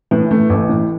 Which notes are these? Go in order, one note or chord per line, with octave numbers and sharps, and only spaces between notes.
A2 E3
A3
A1
A2